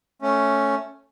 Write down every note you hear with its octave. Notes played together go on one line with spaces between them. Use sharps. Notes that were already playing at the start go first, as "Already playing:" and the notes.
A3 C#4